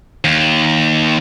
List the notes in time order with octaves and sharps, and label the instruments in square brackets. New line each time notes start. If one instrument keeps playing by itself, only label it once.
[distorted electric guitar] D#2